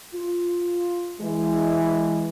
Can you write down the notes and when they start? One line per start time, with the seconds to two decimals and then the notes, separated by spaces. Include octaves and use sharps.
0.13 F4
1.20 E3 G#3